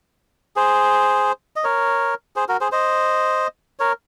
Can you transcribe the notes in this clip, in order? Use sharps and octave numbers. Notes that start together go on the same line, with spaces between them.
G#4 C5
D#5
A#4 C#5
G#4 C5
F#4 A#4
G#4 C5
C5 D#5
A#4 C#5